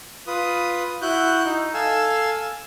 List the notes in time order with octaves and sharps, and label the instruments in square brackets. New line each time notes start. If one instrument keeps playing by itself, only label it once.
[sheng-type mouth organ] F4 B4 D#6
E4 F#4 F#6 G6
D#4
A4 F5 G#5 E6